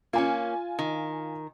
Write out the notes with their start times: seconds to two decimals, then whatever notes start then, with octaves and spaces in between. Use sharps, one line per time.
0.13 A#3 C#4 F4 G#5
0.79 D#3